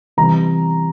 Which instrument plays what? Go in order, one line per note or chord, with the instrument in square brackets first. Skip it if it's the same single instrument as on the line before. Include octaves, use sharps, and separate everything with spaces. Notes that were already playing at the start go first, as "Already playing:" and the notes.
[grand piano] C3 E3 G3 A#5